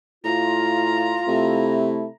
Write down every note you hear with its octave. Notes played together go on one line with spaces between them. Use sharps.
A2 F4 A#5
C3 A3 E4